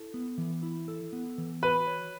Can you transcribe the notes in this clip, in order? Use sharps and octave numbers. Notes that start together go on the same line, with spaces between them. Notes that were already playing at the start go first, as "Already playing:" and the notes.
Already playing: E4 A4
B3
E3
E4
A4
B3
E3
F#4 B4
C#5